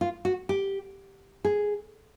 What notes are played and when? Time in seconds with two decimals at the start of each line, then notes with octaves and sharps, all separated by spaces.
0.01 F4
0.25 F#4
0.49 G4
1.45 G#4